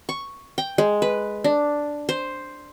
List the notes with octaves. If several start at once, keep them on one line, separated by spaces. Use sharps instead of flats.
C#6
G5
G#3
B4
D4
C5